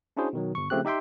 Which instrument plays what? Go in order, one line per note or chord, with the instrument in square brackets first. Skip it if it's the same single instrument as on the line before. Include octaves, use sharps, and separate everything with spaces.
[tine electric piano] C#4 D4 E4 F#4 G#4 C5
B2 D#3 F#3
G1 C#6
C#3 F3 A3 C4 G4 F#6
D#4 G4 E5 G5 C6